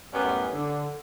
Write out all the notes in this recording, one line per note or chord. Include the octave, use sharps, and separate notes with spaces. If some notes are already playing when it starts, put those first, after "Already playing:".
F#2 A2 G3 B3 C#4 D5
D3